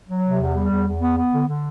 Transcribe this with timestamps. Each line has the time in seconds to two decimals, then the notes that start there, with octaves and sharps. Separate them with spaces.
0.09 F#3
0.25 C3
0.39 E2
0.55 G3
0.71 E2
0.86 E2
1.01 B3
1.17 B3
1.33 D3
1.48 D3